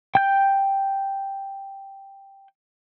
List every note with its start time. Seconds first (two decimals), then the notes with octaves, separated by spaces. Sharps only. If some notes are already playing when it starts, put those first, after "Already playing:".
0.15 G5 G6